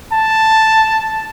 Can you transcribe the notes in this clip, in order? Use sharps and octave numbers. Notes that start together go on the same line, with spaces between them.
A5